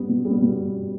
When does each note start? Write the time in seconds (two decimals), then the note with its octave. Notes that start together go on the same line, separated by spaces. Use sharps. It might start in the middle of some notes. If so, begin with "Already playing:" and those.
Already playing: G3 B3
0.09 B2
0.25 G3
0.30 B3
0.42 B2